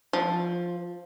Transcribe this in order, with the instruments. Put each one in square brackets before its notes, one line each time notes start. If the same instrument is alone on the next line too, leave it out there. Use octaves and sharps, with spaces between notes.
[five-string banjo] F3